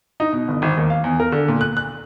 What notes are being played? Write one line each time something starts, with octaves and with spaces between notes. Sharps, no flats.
D#4
B2
G1
G#1
D#2
F5
E2
A#4
D3
A#2
F#6
F#6